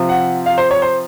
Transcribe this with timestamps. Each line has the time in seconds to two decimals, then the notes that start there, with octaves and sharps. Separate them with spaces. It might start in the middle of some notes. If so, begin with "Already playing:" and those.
Already playing: C3 F3
0.09 F#5
0.46 F5
0.58 C5
0.71 C#5
0.82 C5